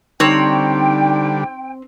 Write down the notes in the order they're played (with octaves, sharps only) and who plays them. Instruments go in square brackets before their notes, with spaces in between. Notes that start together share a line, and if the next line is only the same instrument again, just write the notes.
[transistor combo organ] D3 G3 [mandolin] C4 C#5 [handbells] D#4 [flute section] G5